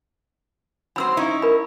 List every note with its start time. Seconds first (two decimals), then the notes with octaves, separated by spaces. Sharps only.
0.96 F#3 C4 C5 B5 E6
1.17 C#4 D#4 E4
1.42 A#4 B5